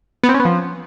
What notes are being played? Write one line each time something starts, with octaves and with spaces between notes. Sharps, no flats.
B3
C4
C#4
B3
F3